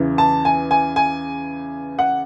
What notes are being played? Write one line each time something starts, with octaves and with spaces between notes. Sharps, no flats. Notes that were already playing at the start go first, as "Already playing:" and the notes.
Already playing: E2 C#3 E3
A5
G#5
G#5
G#5
F#5